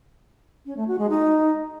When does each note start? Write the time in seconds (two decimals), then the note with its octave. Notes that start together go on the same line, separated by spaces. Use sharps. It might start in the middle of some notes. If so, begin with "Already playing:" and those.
0.66 C#4
0.77 A3
0.87 F#4
0.98 G#3
1.09 D#4